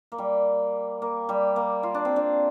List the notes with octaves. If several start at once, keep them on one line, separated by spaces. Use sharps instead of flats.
A#3
G3
A#3
G3
A#3
F4
D4
C4
D4